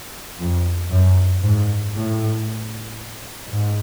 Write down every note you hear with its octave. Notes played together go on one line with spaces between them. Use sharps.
F2
F#2
G#2
A2
G#2